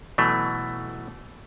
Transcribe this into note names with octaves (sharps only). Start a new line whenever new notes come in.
B2 E3 F#3 A3